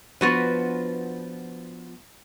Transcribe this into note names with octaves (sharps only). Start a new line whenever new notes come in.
F3 B3 D4 F4 F#4 B4